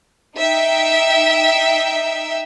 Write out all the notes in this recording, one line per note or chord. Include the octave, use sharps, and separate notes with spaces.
D#4 E5 G5